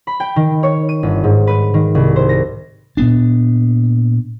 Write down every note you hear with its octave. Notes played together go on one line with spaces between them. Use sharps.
B5
G5
D#3
C#5
D#7
G1
G#2
B4
D#3
C2
C5
A#6
A#2 B3 D4